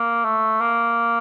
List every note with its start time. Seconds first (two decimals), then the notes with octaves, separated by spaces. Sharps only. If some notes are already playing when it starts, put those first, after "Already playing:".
Already playing: A#3
0.25 A3
0.61 A#3